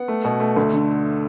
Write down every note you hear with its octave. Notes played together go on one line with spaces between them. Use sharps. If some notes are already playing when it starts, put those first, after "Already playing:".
Already playing: B3 F#5
A3
B2
A3
D2
D3